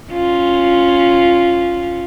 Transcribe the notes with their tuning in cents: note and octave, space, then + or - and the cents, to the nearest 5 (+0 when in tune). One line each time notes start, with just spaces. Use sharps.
C#4 +0 F4 +0